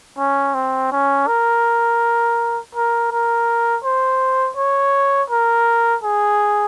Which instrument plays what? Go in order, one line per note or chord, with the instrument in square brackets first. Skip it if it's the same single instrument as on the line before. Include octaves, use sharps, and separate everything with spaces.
[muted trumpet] C#4
C4
C#4
A#4
A#4
A#4
C5
C#5
A#4
G#4